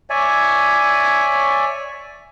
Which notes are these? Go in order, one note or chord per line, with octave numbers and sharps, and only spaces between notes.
C#5 D5 E5 G#5